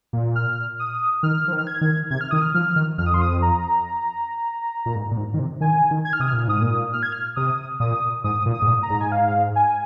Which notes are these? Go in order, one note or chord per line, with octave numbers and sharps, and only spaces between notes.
A#2
F6
D#6
D#3 F6
F3
D#3
F6
G#6
D#3
C3 G#6
F6
D#3 D#6
F6
F3 F6
D#3
F2 F6
D#6
C6
D#6
A#5
A#2
G#2
A#2
G#2
D#3
C3
D#3 G#5
D#3
G#6
F6
C3 D#6
A#2 F6
G#2 D#6
A#2
F6
G#6
F6
C3 D#6
A#2 D#6
G#2 D#6
A#2
D#6
G#2
A#2
A#5
G#2
G#5
F5
G#5